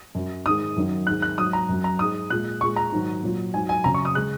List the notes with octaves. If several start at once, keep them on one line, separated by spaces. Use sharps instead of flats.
F#2 F#3
G#2 D#3 G#3 D#6
F#2 D#3 F#3
G#2 D#3 G#3 F#6
F#6
G#2 F#3 D#6
A#5
F#2 F#3
A#5
G#2 G#3 D#6
A#2 G#3 F#6
A#2 G#3 C#6
A#5
G#2 D#3 F#3
A#2 F#3
G#2 F#3 G#5
G#5
F#2 C#3 F#3 A#5
C#6
D#6
C#3 G#3 F#6